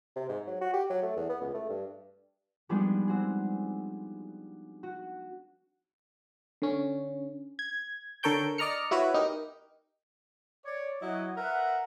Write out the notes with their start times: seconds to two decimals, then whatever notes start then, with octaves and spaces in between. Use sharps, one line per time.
0.16 C3
0.29 G#2
0.47 F#3
0.61 F#4
0.73 G4
0.90 F#3
1.03 A3
1.17 E2
1.29 B3
1.42 C#2
1.54 A3
1.69 G2
2.69 F3 G3 G#3 B3 D4 D#4
3.08 C4 F#4 G#4
4.83 F#4
6.62 D3 C#4
7.59 G#6
8.23 D3 A4 A#4 C#5 G5 G6
8.58 D5 D#5 A#5 F6 C#7
8.91 E4 F#4 B4 C#5
9.14 D#4 G4 A#4
10.65 C#5 D5
11.02 F#3 E4 F#4 C#5 D#5
11.37 A#4 B4 E5 F#5